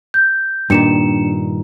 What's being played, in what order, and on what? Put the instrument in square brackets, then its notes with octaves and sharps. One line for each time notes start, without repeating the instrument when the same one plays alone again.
[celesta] G6
[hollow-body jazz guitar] G2 A#2 D#3 [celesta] D4 C#7 E7